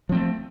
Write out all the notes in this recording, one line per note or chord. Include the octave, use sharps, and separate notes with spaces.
F3 A3 C4